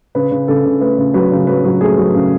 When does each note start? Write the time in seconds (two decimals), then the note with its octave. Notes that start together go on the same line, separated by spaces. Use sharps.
0.15 C#3 B4
0.31 C#3
0.48 C#3 A4
0.65 C#3
0.81 A3 B4
0.98 C#3
1.14 F#3 B4
1.32 C#3
1.47 F#3 B4
1.64 F#3
1.81 A3 G#4
1.97 F#3
2.14 C#3